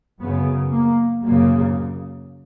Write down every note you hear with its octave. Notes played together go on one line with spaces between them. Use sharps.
F#2 C#3 B3
A#3
F#2 C#3 A#3